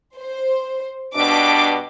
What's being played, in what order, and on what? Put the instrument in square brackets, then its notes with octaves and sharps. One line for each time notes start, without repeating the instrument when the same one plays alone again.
[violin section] C5
[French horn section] G2 B2 D4 [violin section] D6